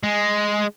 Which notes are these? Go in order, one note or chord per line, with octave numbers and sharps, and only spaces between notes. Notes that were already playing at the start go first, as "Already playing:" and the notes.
G#3